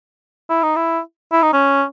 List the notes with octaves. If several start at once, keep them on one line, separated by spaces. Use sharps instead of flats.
E4
D#4
E4
E4
D#4
C#4